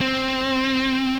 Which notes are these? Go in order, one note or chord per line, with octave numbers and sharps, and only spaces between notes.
C4